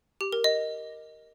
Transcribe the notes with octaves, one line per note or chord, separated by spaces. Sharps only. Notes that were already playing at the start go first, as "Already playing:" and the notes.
G4
A#4
D#5